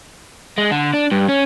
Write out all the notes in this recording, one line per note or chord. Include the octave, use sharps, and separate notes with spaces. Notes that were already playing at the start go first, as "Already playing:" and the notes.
G#3
D3
D4
G2
C#4